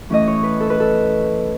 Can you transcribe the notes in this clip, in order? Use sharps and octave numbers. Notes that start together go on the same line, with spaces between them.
A2 E3 A3 C#4 D#5
C#5
B4
A4
B4
A4